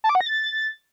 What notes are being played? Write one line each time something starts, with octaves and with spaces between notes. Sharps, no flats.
A5
D6
F#5
A#6
A6